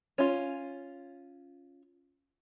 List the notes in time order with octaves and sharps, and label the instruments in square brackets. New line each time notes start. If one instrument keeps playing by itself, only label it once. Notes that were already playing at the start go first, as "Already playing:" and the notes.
[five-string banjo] C#4 F4